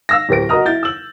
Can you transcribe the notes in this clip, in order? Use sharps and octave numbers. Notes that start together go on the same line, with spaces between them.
F5 E6 A#6
D1 G4 A#4 C5 A#6 D7
F#4 A#4 D#5 A#5 D#6 F6
E4 G6 A6
E6 F#7